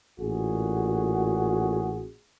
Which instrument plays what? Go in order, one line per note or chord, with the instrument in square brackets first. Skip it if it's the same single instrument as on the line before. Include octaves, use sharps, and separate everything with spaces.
[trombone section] A1 A#2 F#4 G#4